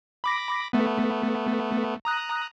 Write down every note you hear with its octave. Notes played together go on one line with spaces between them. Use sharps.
B5 D6 A#6
A3 B3
A#5 D#6 F#6